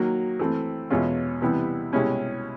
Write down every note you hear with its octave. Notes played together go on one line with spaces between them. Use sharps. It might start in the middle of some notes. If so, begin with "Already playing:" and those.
Already playing: D#3 F#3 A#3
E3 A3 C4
E2 B2 G#3 C#4 F4
C3 E3 G3 B3 E4
C2 B2 G#3 C#4 E4